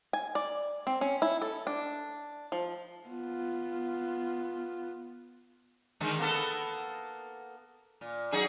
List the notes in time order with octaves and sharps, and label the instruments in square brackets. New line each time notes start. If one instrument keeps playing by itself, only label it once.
[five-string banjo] G#5
D5
C4
C#4
E4
A4
D4
F3
[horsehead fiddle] B3 F4
[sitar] D3 D#3 G#3
A#3 B3 A4
A#2
F#3 D#4 G#4